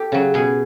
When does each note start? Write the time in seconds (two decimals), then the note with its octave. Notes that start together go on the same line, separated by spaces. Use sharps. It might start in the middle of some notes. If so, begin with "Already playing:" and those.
Already playing: G4 A4
0.12 C#3 F#3
0.34 B2 G#4